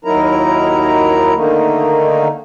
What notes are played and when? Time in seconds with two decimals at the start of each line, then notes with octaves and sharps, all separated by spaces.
0.05 D#2 F#3 D#4 E4 A#4 A#5
1.35 D3 D#3 A3 A#3 D#4